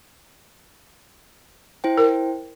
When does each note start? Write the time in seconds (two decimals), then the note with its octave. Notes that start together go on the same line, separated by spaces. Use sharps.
1.84 E4 C5 G5
1.98 A#4